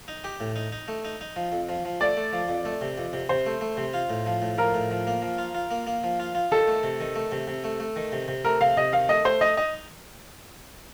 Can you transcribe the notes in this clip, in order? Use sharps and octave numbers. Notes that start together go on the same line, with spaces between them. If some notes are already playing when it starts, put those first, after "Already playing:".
D#4
G4
A2
D#4
D#4
A3
D#4
D#4
F3
F2
F3
F3
A3 D5
A3
F3
F2
A3
C3
F2
C3
C3 C5
A3
A3
C3
F4
A2
F3
A2
F3 A#4
A2
F3
A#3
F3
F4
F4
A#3
A#3
F3
F4
F4
D#3 A4
A3
C3
D#3
A3
C3
C3
A3
A3
D#3
C3
C3
A3 A#4
C3 F5
C3 D#5
D#3 F5
A3 D#5
A3 C5
D#4 D#5
D#4 D#5